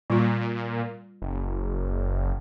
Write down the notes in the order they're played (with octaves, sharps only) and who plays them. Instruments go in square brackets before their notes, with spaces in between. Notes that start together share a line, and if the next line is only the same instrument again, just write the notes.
[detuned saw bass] A#2 [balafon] G3 F4
[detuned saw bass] F#1